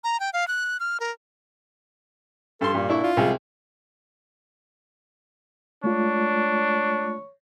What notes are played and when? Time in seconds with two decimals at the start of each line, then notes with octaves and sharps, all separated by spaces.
0.04 A#5
0.20 G5
0.33 F5
0.48 F#6
0.80 F6
1.00 A#4
2.61 G2 A4 C6
2.74 G2 A#2
2.89 D4 E4 C#6
3.03 F4
3.17 C2 G#3 G#4
5.84 G#3 A3 D4 F4 C#5